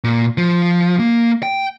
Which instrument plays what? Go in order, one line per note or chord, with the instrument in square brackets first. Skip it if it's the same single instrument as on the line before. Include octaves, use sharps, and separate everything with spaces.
[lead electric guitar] A#2
F3
A#3
G5